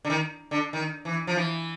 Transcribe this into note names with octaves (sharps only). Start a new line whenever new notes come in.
D3
D#3
D3
D#3
E3
F3
E3